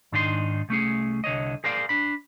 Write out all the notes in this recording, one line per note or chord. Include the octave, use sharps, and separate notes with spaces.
G#2 D#3 D4 D#4 B4 C6
C2 A3 C#4 G#4
C2 D3 C#5 D#5
G#4 A#4 C5 D5 F5
D4 B5